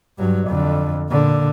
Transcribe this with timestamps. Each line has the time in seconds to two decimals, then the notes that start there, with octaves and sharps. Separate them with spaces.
0.18 G2 F#3
0.48 F2 D3
1.10 A#2 D3